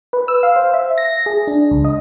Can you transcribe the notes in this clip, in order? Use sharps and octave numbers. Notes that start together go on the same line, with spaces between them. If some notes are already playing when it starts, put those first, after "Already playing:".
B4
E6
F5
C5
E5
A#6
G#4
D4
C#2
D#5